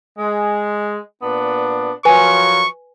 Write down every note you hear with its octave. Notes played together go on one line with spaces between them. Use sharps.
G#3
A#2 B3 D4
F3 F#3 A#4 B4 G#5 C#6